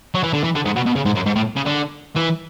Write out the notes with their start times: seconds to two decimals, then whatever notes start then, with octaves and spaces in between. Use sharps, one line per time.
0.15 F#3
0.23 E3
0.33 D3
0.44 E3
0.55 D3
0.65 G#2
0.76 B2
0.86 B2
0.95 C#3
1.05 G#2
1.15 F#2
1.26 G#2
1.36 A2
1.56 C#3
1.66 D3
2.16 E3